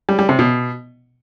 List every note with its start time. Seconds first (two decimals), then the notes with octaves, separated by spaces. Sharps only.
0.09 G3
0.19 G3
0.29 C3
0.39 B2